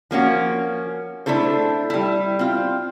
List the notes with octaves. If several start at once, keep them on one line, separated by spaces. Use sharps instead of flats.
F3 A#3 C#4 F#4
A3 D4 E4 A4 C5
G3 E4
C4 F4